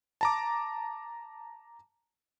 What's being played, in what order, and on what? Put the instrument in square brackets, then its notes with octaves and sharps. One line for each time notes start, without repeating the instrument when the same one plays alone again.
[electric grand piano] A5 A#5 D6